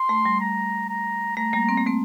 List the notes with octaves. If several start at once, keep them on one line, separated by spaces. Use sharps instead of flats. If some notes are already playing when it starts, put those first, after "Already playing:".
Already playing: C6
A3
G3
A#5
A#5
A3 A#5
G3 A#3
C4
A#3
A3 C4